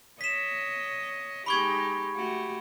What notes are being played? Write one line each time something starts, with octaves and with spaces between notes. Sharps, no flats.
C#5 D#5 B6 E7
G#3 D#4 G4 B5 C#6 G#6
A3 F#4 G4